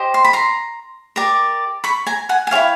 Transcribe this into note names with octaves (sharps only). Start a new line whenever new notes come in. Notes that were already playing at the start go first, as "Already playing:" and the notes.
Already playing: G4 C5 D#5
C6
B5
A#5 C6
G4 A#4 D5
B5 C#6
G#5 A#5
F#5 G#5
G#5
E4 A4 C#5 F5 G5